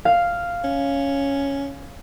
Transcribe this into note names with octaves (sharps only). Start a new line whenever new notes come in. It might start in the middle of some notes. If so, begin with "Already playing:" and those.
F5
C#4